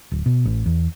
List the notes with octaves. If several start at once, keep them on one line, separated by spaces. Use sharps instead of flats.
D1
B2
A1
E2